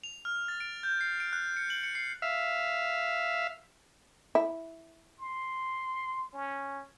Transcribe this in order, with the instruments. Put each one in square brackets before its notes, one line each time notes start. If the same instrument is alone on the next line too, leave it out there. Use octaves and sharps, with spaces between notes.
[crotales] F7
F6
A6
D7
G6
C7
D7
F#6
C#7
F#7
C#7
C7
[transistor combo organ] E5 F5
[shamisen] E4
[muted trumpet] C6
C#4